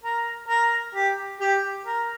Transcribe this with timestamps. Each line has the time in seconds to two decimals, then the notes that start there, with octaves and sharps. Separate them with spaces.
0.04 A#4
0.48 A#4
0.95 G4
1.40 G4
1.86 A#4